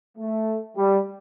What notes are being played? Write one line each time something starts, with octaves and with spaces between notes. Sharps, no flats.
A3
G3